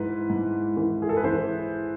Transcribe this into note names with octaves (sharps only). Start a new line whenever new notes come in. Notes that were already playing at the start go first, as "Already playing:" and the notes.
Already playing: G#2 E3 B4
G#2
E3
G#4
A4
B4
E3 C5